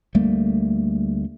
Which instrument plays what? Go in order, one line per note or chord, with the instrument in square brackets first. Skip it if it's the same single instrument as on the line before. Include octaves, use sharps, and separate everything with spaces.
[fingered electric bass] D2 G3 A3 A#3